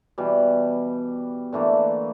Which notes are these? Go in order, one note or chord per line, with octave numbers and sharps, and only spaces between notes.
B2 E3 G3
D3 E3 A3 A#3